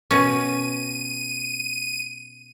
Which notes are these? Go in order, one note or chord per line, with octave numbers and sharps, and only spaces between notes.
B2 C#4 D#7